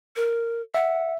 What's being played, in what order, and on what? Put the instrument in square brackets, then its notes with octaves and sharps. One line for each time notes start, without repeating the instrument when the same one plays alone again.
[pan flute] A#4
[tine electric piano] E5 [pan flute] F#5